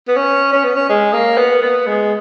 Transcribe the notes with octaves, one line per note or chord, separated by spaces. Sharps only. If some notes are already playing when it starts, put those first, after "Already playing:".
B3
C#4
C#4
B3
C#4
G#3
A#3
B3
B3
G#3